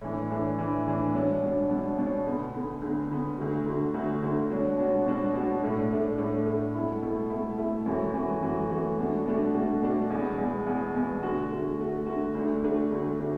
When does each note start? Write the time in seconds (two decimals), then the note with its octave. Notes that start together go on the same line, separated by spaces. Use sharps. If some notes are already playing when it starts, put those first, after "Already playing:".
0.01 A2 E3 D4
0.30 A2 E3 D4
0.58 A2 E3 D4
0.86 A2 E3 D4
1.14 B2 F#3 D4
1.42 B2 F#3 D4
1.70 B2 F#3 D4
1.98 B2 F#3 D4
2.26 D2 D3 B3
2.54 D2 D3 B3
2.81 D2 D3 B3
3.10 D2 D3 B3
3.38 D2 D3 A3 F#4
3.66 D2 D3 A3 F#4
3.94 D2 D3 A3 F#4
4.22 D2 D3 A3 F#4
4.50 B2 F#3 D4 F#4
4.78 B2 F#3 D4 F#4
5.06 B2 F#3 D4 F#4
5.34 B2 F#3 D4 F#4
5.62 A2 A3 D4
5.90 A2 A3 D4
6.18 A2 A3 D4
6.46 A2 A3 D4
6.75 B2 A3 E4
7.02 B2 A3 E4
7.30 B2 A3 E4
7.58 B2 A3 E4
7.86 F#2 E3 A3 F#4
8.14 F#2 E3 A3 F#4
8.42 F#2 E3 A3 F#4
8.70 F#2 E3 A3 F#4
8.99 B2 A3 D4 F#4
9.26 B2 A3 D4 F#4
9.54 B2 A3 D4 F#4
9.82 B2 A3 D4 F#4
10.10 E2 B2 B3
10.38 E2 B2 B3
10.67 E2 B2 B3
10.95 E2 B2 B3
11.23 D3 A3 F#4
11.51 D3 A3 F#4
11.79 D3 A3 F#4
12.06 D3 A3 F#4
12.35 D2 D3 A3 D4 F#4
12.63 D2 D3 A3 D4 F#4
12.91 D2 D3 A3 D4 F#4
13.19 D3 A3 D4 F#4